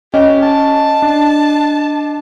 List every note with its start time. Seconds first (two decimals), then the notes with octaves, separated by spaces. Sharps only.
0.14 C#4 G4 D#5
0.43 A5
1.02 D4